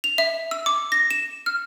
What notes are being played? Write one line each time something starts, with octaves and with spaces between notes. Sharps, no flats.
F7
E5
E6
D6
A#6
E7
F6